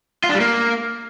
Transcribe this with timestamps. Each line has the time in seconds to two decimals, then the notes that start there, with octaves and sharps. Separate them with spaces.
0.24 F4
0.29 D4
0.35 G3
0.40 A#3